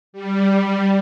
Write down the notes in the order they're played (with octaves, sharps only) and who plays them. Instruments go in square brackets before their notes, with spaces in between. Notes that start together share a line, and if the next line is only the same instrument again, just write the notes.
[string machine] G3